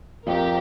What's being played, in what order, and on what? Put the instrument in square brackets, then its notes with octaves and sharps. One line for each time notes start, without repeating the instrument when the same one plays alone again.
[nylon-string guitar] F2 [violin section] C4 G4 A#4